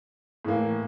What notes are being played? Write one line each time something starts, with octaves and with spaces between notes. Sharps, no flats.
A2 E3 A#3